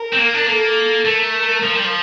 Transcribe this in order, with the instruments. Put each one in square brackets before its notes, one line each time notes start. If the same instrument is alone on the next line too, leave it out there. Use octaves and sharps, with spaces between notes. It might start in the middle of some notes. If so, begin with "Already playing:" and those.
Already playing: [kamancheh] A#4
[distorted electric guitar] C4
A#3
D4
[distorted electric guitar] A#3 [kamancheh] A4
[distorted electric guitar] A3 [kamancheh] A#4
[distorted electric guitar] F3
G3
F3